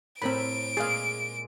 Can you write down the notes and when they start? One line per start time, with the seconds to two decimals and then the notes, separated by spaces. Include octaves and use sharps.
0.22 A2 C4 A#4 E5 B5 D7
0.77 A#2 G#3 G#4 F5